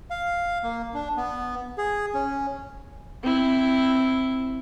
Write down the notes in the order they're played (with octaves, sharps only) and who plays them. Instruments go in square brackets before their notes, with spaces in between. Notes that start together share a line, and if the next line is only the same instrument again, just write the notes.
[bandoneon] F5
A#3
D4
B3
G#4
C#4
[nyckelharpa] C4 E4